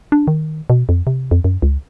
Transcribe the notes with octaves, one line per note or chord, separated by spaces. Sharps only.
D4
D#3
B2
F2
C3
F2
F#2
C#2